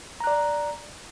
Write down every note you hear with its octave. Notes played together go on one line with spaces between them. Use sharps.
D5 A#5 F#6